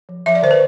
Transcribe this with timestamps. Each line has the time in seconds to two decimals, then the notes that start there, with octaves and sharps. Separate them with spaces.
0.09 F3
0.26 F3 E5
0.35 D5
0.42 D3 C5
0.51 B4